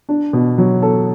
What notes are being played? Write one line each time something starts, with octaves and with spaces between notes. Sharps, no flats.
D4
B2
F#3
A4